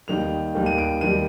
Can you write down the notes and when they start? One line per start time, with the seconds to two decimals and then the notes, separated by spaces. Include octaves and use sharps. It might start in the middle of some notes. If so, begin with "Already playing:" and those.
0.08 D#2 D#3 G3 F7
0.55 D#2 D#3 G3
0.66 D#7
0.78 D7
1.01 D#2 D#3 G3 D#7